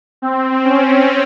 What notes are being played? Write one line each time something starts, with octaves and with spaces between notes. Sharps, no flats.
C4
C#4